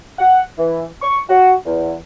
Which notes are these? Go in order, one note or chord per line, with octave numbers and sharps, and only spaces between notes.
F#5
E3
C#6
F#4
E2